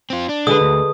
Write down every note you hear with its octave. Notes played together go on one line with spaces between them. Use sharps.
C4 F4
D4
D3 G#3 B4 D#6
D2